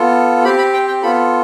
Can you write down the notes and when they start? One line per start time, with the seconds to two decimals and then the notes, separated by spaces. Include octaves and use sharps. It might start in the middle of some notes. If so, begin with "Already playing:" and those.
Already playing: B3 F4 A4
0.44 C4 G4 B5
0.58 B5
0.74 G5
0.88 G5
1.02 B3 F4 A4 B5